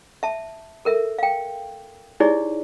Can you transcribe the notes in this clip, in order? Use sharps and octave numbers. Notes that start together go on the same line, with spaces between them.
E5 A5
A4 A#4 E5
F5 G5
D#4 E4 G4 G#4 C#5 D5